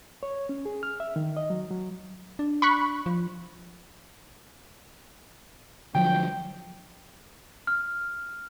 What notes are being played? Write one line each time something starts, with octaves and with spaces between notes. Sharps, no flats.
C#5
C#4
G#4
F6
E5
D#3
D#5
F#3
F#3
D4
B5 C#6 F#6
F3
D3 F3 F#3 G5
F6